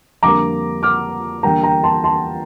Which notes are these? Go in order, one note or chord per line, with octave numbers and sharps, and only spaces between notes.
F2 D3 G3 A#3 A#5 D6
D6 F6
E2 D3 G3 A#3 G5 A#5
G5 A#5
A5 C6
A5 C6